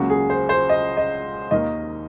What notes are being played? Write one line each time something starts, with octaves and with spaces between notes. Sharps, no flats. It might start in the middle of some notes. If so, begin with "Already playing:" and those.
Already playing: C#2 C#3 F#3 A#3 F#4
G#4
C5
C5
D#5
D#5
D#2 D#3 A#3 D#5